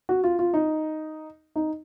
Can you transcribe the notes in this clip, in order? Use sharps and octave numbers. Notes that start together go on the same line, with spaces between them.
F#4
F4
F4
D#4
D#4